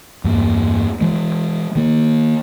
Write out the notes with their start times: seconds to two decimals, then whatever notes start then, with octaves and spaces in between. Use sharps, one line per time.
0.24 E2 G2 A#3
1.01 E3 G#3
1.75 D#3 A#3